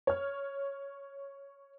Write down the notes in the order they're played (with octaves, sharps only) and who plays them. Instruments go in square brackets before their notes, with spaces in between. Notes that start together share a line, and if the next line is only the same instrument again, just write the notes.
[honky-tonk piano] C#5 F6